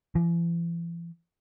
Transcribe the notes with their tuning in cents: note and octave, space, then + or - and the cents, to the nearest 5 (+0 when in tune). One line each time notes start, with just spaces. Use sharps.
E3 +45